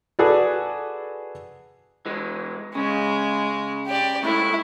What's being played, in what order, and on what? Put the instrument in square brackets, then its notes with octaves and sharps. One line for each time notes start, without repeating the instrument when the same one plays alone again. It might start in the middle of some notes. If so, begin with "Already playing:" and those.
[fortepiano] F#4 G#4 A4 B4 D5
[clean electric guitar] E3 G#3
[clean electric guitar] C#3 C#4 [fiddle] G#3
[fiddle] G4 D5
[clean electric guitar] A2 G#3 A3 [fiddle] E4